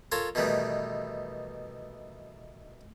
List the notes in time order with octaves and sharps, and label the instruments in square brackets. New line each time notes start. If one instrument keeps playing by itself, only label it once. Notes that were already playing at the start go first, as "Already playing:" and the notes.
[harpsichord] F4 A4 A#4 C#5
B2 D#3 E3 G3 A3